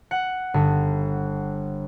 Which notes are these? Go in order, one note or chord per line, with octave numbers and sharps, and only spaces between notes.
F#5
G1